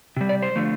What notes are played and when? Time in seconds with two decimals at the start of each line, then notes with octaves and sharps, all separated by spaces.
0.17 C3 G3
0.29 D5
0.43 C5
0.56 D3 F3 A3